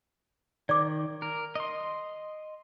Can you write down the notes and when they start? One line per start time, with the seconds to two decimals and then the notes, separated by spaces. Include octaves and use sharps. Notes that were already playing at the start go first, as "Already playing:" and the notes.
0.69 D#3 D5 D6
1.22 A#4
1.55 D#5 C6